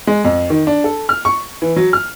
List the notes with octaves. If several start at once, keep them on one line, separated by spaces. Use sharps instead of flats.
G#3
F2
D#3
D4
A4
F6
C#6
E3
F#3
F6